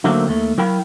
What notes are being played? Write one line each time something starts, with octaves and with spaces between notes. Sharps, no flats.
D3 D#3 F#3 A3 A#3 C4
D#2 A3
F#3 E4 A#4 F5 G5 B5